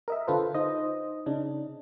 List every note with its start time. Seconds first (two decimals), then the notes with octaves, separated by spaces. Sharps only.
0.08 A#4 D#5 E5
0.27 D3 F4 A4 B4 C5
0.55 D#4 C5 D#5
1.26 C#3 D4 D#4